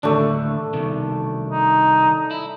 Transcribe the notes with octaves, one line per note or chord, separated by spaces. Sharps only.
D#2 A2 D3 A3 D4
C2 B2 D#3
D#4
E4